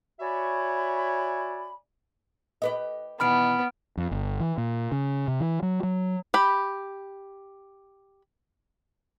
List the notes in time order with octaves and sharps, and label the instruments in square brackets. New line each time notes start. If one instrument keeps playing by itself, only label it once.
[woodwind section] F#4 C#5 D5 E5 G#5 B5
[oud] G4 B4 D#5
[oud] B2 D#3 E3 [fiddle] B3 [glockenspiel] B5 F6 D7
[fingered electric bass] F2
G1
E3
A#2
C#3
C3
E3
F#3
F#3
[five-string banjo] G4 B5